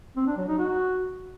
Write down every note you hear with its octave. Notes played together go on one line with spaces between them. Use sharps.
C4
D4
F#3
D#4
F#4